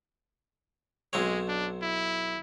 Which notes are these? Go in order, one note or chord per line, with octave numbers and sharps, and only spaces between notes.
B1 G#3 C4 C#5
D4
E4